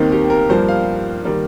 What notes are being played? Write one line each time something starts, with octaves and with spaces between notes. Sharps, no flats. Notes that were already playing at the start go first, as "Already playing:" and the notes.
Already playing: D#2 D#3 A#3 C4 D#4
G4
A#4
G2 F3 A#3 C5
F5
D#3 G3 A#3